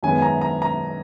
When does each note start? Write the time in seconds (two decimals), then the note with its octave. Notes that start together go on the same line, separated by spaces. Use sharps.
0.03 F#2 D#3 G#3 B3 G#5
0.18 G#5
0.22 A#5
0.41 A#5
0.62 A#5